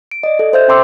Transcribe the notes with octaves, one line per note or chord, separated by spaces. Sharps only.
D7
D5 D#5
A4
C5 E5 G6
C#4 G5 A5 C6 D6 E6